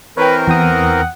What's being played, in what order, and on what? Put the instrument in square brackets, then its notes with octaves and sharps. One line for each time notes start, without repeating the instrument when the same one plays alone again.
[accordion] E3 C4 A#4 [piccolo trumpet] B4 [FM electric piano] C#5 G5
[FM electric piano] E2 G5 D#6 [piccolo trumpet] F#5